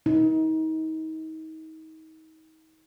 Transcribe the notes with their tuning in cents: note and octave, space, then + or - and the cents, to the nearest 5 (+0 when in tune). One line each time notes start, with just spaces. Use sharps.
D#4 +35